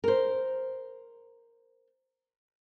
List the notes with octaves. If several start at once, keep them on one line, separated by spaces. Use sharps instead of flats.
A#4 C5